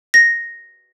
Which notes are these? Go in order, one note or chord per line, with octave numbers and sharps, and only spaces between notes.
A#6